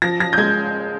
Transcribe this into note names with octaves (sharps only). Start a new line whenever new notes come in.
F3 A#6
F3 A#6
G6
G#3 G#6